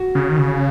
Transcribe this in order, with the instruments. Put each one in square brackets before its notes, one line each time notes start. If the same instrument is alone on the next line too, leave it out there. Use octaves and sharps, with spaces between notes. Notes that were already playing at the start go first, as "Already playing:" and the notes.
Already playing: [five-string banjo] F#4
[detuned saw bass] C#3
D#3
C#3